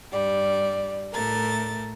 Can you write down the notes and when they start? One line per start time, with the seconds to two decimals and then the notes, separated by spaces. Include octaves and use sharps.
0.12 G2 G3 D5
1.14 A2 A3 A#4 A6